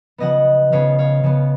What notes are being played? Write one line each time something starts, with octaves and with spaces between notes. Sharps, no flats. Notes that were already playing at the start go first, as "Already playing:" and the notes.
C#3 F3 B3 D#5 F#5
C#3 F3 B3 C#5 F5
C#5 F5
C#3 F3 B3